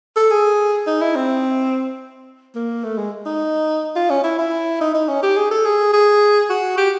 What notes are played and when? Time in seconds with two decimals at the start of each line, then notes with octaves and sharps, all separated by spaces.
0.16 A4
0.31 G#4
0.87 D#4
1.01 E4
1.15 C4
2.55 A#3
2.84 A3
2.98 G#3
3.26 D#4
3.96 F4
4.10 C#4
4.24 E4
4.38 E4
4.81 D#4
4.94 D#4
5.08 C#4
5.22 G4
5.37 G#4
5.51 A4
5.65 G#4
5.93 G#4
6.49 F#4
6.77 G4